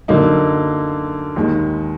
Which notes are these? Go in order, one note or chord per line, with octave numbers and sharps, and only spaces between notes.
F#2 D3 F#3 A#3 D#4
D#2 D#3 G#3